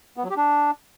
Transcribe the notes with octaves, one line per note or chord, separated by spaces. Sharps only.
B3
F#3
G4
D4